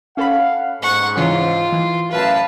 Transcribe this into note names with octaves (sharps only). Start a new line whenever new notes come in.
C#4 A4 F5 F#5 B5
G#2 F#5 C#6
C#3 E3 C#4 F4
E3
A1 F#2 B4 F5 A5